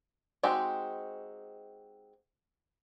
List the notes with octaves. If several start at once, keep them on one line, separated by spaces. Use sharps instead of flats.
G#3 C4 D#4 F#4 G4